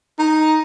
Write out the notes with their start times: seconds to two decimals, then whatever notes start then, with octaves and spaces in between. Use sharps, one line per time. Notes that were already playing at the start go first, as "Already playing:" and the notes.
0.19 D#4